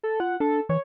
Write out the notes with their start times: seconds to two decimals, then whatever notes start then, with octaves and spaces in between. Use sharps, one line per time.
0.03 A4
0.20 F4 F#5
0.40 D4 A4
0.69 E3 C#5